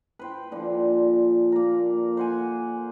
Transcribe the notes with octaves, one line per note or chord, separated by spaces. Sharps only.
B4 C5 G5
A#2 D3 F3
A#3 A#4
C5 F#5 G#5